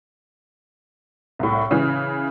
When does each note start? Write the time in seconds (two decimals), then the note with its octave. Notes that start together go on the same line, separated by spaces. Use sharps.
1.39 C2 A2
1.71 C#3 E3